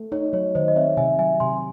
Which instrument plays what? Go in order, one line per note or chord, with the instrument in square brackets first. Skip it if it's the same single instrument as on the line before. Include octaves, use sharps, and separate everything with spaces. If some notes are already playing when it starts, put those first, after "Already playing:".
Already playing: [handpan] A3
[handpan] D#4 [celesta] C#5
[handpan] F#3 [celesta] C#5
[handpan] D#3 [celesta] C5 D#5
[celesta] D#5
[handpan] C4 [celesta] C#5 E5
[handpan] C3 [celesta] E5 G#5
[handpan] F#3 [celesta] E5 G#5
[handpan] C3 [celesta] G#5 C6